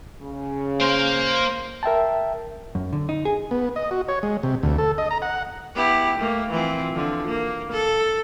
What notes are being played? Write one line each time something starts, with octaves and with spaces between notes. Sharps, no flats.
C#3
A#3 C5 F5
A#4 E5 G5 A5
F#2
D3
D#4
G#4
B3
D#5
F#4
C#5
G#3
C3
D2
A4
D#5
A#5
F#5
B3 E4 G4
A3 A#3
E3 F3 C4
D3 F3
A#3
A4